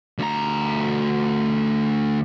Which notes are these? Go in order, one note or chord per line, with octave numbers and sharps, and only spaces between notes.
D2 A#5